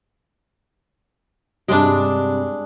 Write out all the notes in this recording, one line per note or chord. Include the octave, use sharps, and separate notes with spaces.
G2 C3 G#3 D4 G4